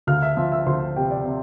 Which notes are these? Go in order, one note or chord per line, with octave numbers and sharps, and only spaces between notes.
D2 F5 F6
E5 E6
F3 E5 E6
E5 E6
D2 C5 C6
C3 G4 G5
D5
C3